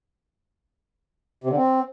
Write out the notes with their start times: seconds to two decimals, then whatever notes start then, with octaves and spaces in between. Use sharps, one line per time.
1.44 C3
1.50 D3
1.57 C4